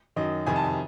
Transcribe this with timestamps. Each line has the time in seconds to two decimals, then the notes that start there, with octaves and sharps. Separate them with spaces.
0.16 F#2 D#3 D#5
0.46 F2 C3 D#3 G#5
0.56 A5
0.64 G#5